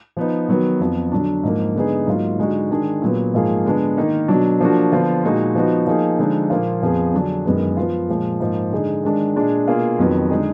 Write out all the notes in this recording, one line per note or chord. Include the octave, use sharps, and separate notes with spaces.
F3 B3 D#4
D#3 F#3 B3
F2 F3 B3
D3 F#3 D4
G#2 F3 A#3
D3 G#3 B3 D#4 G#4
G#2 F#3 A#3 F4
D3 G#3 D#4 F#4
D#3 G#3 D4 G#4
A#2 F#3 B3
G#2 F3 A#3 F4 G#4
D3 G#3 B3 D4
D#3 A#3 D#4
B2 F#3 D4
F3 A#3 D4 F#4
D3 F3 B3 F4
A#2 G#3 D#4 F#4
F3 B3 D#4 F#4
F3 A#3 D#4 G#4
D3 F3 G#3 D#4
A#2 F3 A#3 F4
F2 F3 B3 F4 G#4
D3 F#3 D4 G#4
F#2 D#3 G#3 B3
F3 B3 F4
A#2 F3 G#3
G#2 F3 A#3
D3 G#3 D#4 G#4
D#3 G#3 D4
A#2 G#3 D4 G#4
B2 A#3 F4 G#4
F2 D#3 F#3 B3
D3 G#3 D#4 G#4